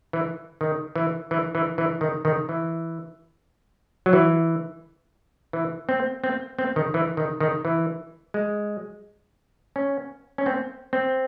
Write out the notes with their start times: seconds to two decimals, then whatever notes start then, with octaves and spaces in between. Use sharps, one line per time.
0.13 E3
0.61 D#3
0.95 E3
1.31 E3
1.55 E3
1.78 E3
2.01 D#3
2.25 D#3
2.49 E3
4.06 F#3
4.13 E3
5.53 E3
5.89 C4
6.24 C4
6.59 C4
6.76 D#3
6.94 E3
7.17 D#3
7.40 D#3
7.65 E3
8.34 G#3
9.76 C#4
10.38 C#4
10.46 C4
10.93 C4